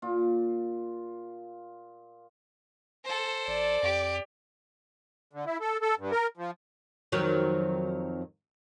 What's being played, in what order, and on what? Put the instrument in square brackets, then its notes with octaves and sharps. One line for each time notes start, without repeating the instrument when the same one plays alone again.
[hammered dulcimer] A#2 F4
[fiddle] A4 C5
[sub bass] A1 [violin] D5
[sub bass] F2 [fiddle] G4
[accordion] D3
E4
A4
A4
G2
A#4
F3
[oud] F2 D#3 F#3